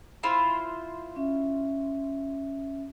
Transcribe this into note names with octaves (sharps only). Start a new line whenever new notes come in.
E4 F4 C5
C#4 E5